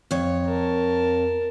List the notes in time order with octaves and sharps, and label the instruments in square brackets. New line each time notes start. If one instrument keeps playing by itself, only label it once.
[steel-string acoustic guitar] F2 C#5
[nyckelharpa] A#4 A5